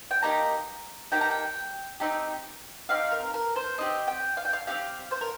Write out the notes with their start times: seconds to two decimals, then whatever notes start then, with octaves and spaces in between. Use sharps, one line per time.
0.11 G5
0.23 A#3 D#4 G4 A#5
1.12 A#3 D#4 G4 G5
1.21 A#5
1.31 G5
2.00 C4 D#4 G4
2.89 C4 D#4 G4 F5
3.11 A#4
3.34 A#4
3.56 C5
3.78 C4 D#4 G4 D#5
4.08 G5
4.37 F5
4.45 G5
4.53 F5
4.67 C4 D#4 G4 F5
5.11 C5
5.21 A#4